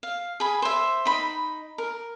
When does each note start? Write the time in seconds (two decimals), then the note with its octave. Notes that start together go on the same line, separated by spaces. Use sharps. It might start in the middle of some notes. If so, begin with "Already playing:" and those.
0.03 F5
0.40 G#4 B5
0.62 C5 E5
1.05 D#4 B5
1.78 A#4